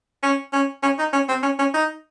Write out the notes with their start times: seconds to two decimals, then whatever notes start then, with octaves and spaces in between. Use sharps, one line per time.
0.23 C#4
0.53 C#4
0.82 C#4
0.99 D#4
1.13 C#4
1.29 C4
1.43 C#4
1.59 C#4
1.74 D#4